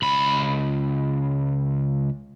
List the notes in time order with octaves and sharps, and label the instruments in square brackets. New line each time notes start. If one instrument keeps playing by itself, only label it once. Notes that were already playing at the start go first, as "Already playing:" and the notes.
[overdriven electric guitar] C#2 B5